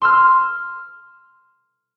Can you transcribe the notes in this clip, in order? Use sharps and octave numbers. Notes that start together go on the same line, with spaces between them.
C6 E6 F6